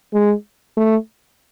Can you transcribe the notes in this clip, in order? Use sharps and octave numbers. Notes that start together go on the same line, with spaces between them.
G#3
A3